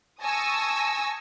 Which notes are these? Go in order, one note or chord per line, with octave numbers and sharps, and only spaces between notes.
G#5 A5 C#6 D#6 E6 A#6